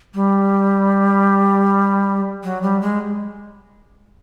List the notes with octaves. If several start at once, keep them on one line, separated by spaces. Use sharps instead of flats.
G3
F#3
G3
G#3